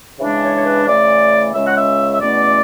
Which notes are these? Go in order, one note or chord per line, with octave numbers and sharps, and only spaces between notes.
C#3 E3 G#3 D4
C#5
C#5
B4
C#3 E3 A3 D5
C#2 C#3 G#3 C#4 E5
F#5
E5
E5
E2 B2 A3 C#4 D5